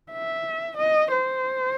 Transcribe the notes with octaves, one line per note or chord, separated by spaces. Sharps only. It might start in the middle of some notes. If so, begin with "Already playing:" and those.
E5
D#5
C5